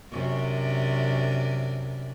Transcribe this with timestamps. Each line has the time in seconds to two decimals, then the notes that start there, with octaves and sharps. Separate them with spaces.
0.12 F#2 C3 D4